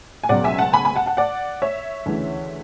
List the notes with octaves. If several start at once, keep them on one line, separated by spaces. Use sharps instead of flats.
G#5
C#2 B2 F#3 D5 F#5
E5 G#5
F#5 A5
G#5 B5
G#5 B5
F#5 A5
F#5 A5
D5 F#5
C#5 E5
D2 C#3 E3